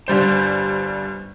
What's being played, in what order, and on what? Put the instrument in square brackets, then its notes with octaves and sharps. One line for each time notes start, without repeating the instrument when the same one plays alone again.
[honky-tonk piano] G1 G3 C5 E7